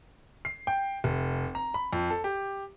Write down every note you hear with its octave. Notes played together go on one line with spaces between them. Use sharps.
C7
G5
F1
A#5
B5
F2
A4
G4